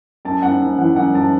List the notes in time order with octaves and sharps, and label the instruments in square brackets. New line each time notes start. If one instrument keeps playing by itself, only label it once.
[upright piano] F#2 A5
F#2 F#5
F#2
E3 F#5
F#2 F#5
F#2 A5